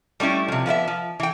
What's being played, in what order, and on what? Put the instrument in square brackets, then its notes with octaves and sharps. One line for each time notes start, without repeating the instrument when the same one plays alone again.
[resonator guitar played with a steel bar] G3 A3 C#4 E4
C3 F3
F3 B3 D5 E5
F3
E3 G5